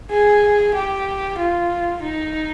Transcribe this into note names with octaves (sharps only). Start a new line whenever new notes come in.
G#4
G4
F4
D#4